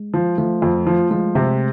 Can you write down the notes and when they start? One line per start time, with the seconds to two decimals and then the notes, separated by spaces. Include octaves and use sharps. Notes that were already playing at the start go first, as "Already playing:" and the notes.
Already playing: G#3
0.14 F3
0.38 F3 A3
0.62 F2
0.87 F3
1.11 F3 G#3
1.35 C3